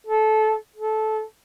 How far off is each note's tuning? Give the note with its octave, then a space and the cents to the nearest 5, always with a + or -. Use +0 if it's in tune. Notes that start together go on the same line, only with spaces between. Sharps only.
A4 -20
A4 -15